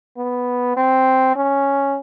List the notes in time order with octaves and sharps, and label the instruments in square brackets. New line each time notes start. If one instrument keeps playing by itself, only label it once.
[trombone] B3
C4
C#4